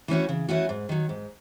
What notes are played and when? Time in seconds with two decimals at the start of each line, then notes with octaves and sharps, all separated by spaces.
0.08 E3 A3 C#4 F#4
0.29 C#3
0.48 E3 A3 C#4 F#4
0.69 G#2
0.89 D#3 F#3
1.09 G#2